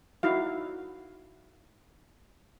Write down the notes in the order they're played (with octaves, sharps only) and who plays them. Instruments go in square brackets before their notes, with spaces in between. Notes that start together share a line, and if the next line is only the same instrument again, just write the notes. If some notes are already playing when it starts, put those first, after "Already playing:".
[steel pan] D#4 E4 F#4 F5